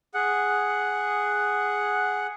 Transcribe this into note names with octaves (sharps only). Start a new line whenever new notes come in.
G#4 F#5